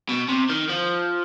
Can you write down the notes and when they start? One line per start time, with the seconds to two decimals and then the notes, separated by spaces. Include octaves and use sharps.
0.09 B2
0.29 C3
0.50 D#3
0.70 F3